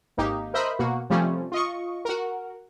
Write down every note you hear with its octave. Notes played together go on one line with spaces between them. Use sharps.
G#1 A#3 D#4 G4
A#4 C5 D#5 E5 B5
B2 A#3 F#4
C3 F3 G3 A3 C4 C#4
F4 D#5 C#6
F#4 A#4